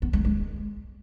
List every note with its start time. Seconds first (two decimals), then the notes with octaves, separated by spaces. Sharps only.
0.02 B3
0.13 G#3
0.25 G#3